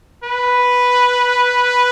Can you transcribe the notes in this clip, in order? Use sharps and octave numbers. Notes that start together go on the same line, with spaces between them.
B4